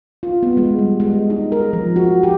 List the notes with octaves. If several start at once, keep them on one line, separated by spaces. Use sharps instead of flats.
F4
B3
G#3
G3
G#3
D#4
A#4
F3
F#4
G4